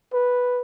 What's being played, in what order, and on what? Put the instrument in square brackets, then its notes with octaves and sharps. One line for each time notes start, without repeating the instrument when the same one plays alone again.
[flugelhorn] B4